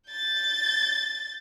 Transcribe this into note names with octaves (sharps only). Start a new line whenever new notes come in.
G6 A6